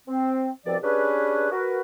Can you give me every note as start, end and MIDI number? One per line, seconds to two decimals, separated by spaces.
0.08 0.50 60
0.66 0.77 36
0.66 0.77 47
0.66 0.77 53
0.66 0.77 60
0.66 0.77 74
0.83 1.52 61
0.83 1.52 62
0.83 1.52 67
0.83 1.52 68
0.83 1.52 71
1.52 1.80 66
1.52 1.80 70
1.52 1.80 71